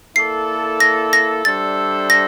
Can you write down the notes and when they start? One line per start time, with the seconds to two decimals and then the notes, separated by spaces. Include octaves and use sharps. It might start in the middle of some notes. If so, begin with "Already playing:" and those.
0.15 A#3 E4 A4 D5 C7
0.80 A#6
1.13 A#6
1.45 G3 D4 A4 C5 E5 A6
2.10 A#6